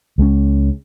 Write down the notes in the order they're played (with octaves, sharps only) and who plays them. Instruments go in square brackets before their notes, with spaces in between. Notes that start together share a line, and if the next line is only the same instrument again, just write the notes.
[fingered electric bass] C#2 G#3 C4 C#4